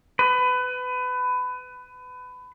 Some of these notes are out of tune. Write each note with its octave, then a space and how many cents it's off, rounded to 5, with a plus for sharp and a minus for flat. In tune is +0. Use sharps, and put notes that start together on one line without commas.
B4 +25